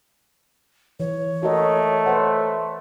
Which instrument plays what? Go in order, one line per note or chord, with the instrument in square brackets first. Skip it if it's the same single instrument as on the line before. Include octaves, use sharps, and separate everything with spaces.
[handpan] E3 [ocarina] C#5
[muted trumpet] A3 [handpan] F#4 A#4 D#5
[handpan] B4 C5 F#5